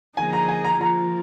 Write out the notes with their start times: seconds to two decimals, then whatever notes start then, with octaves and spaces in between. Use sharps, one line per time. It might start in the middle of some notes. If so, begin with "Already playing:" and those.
0.17 D3 F3 A#3 D#4 G#4 G#5
0.33 A#5
0.49 G#5
0.64 A#5
0.80 F3 A#3 F4 A#5